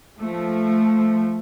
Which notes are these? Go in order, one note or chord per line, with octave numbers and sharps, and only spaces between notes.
F3 A3